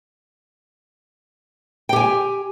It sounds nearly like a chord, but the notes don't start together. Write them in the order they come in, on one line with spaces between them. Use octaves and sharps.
G5 G4 G#5